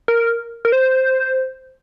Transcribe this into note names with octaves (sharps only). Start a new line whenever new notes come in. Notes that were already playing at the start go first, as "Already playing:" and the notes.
A#4
A#4
C5